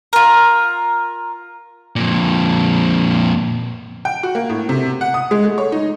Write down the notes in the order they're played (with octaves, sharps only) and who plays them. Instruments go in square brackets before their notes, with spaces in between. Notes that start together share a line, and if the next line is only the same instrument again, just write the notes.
[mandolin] F4 A#4
[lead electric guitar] F2 A#2
[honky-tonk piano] G5
F#4
A#3
A2
C3
F#5
D#6
G#3
A3
C#5
D#4